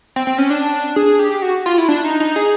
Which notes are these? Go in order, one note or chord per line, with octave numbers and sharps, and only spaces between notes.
C4
C4
C#4
D4
G#4
G4
F#4
F4
E4
D4
D#4
D#4
G#4